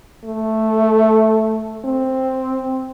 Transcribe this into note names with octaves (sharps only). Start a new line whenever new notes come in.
A3
C4